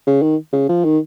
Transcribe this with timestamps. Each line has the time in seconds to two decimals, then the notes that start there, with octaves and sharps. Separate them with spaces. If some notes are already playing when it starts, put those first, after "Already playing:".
0.07 C#3
0.22 D#3
0.53 C#3
0.69 F3
0.84 D#3